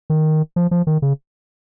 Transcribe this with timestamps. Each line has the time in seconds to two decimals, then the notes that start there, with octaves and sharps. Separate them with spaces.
0.10 D#3
0.56 F3
0.71 F3
0.87 D#3
1.02 C#3